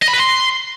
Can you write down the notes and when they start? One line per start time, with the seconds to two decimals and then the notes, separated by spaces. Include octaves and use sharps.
0.03 D#5
0.08 B5
0.14 B4
0.19 C6